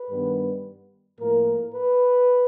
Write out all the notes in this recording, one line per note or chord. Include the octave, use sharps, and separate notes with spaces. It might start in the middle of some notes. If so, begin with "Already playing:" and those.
Already playing: B4
G2 D#3 G3 B3
A2 F3 A#3 A#4
B4